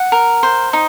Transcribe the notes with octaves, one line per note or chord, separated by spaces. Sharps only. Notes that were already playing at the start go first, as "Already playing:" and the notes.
Already playing: F#5
A#4
C5
D#4